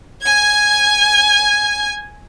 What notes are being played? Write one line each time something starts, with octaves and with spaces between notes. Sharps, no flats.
G#5 G#6